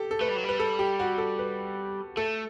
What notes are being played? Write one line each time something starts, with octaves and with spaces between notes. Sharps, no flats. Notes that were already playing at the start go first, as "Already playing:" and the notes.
Already playing: G4 A4
A4
A3 B4
G3
F#3
G3 B4
A4
G4
F#4
A4
B4
A3 A4